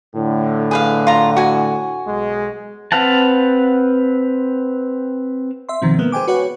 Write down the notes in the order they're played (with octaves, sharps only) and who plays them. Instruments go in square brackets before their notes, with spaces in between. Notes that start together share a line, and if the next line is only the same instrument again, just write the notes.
[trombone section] A2 D3
[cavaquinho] G#4 B4 F5
F4 A#5
F#4 G#5
[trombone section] B1 G#3
[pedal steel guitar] C4 B4 F5 F#5 A5
[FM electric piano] E5 C6
B2 D#3 F3 C4
G#3 A#3 B3
G#4 C5 G5 G#5 D6
F#4 B4 C#5 F#5